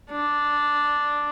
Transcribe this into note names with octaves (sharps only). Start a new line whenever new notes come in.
D4